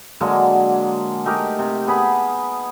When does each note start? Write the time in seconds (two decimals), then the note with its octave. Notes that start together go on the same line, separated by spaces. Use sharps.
0.21 D3 F#3 G#3 A#3
1.25 A3 D#4 G4 A#4
1.59 C3
1.87 B3 G#4 B5